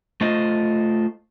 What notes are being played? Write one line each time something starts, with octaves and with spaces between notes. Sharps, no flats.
A3 F4 C5 D#5